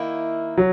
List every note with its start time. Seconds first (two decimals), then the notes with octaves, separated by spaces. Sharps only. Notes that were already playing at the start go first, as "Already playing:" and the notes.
Already playing: D#3 A#3 E4
0.58 F#3